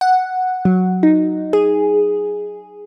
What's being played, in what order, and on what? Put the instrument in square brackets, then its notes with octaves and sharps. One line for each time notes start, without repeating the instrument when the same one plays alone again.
[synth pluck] F#5
F#3
D#4
G#4